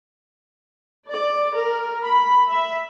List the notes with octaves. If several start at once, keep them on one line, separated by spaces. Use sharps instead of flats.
D5
A#4
B5
E5